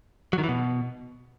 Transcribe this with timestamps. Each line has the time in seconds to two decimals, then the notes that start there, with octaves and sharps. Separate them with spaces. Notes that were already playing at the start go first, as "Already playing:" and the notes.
0.33 F#3
0.38 D#3
0.44 E3
0.49 B2